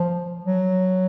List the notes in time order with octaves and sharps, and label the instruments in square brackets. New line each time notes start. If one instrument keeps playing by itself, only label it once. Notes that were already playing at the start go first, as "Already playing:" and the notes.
Already playing: [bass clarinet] F3
F#3